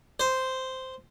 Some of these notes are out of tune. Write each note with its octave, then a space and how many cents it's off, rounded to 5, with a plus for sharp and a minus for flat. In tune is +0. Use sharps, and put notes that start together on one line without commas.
C5 -5